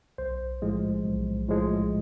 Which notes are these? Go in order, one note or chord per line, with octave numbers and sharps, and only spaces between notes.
B1 C5
A2 F3 G#3
B1
A2 F3 G#3